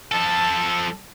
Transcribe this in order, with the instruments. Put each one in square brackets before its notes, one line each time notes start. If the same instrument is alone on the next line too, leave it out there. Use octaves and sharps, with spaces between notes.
[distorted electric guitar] F3 A4 [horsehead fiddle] A5